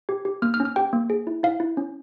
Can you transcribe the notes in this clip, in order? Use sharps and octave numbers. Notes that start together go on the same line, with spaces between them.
G4
G4
A#3 F6
F6
C#4
F6
G4 G5
A#3
G#4
E4
E4 F5
E4
C#4